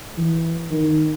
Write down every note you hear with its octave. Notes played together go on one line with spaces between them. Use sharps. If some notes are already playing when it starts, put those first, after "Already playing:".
E3
D#3